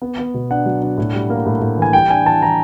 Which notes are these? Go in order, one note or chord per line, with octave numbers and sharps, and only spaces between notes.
B3
B3
B2
D4 F#5
F#3
D4
A2
G3
A#3
A2
A2
E3 G#5
G3 G5
D4 G#5
E3 A5
E3 A#5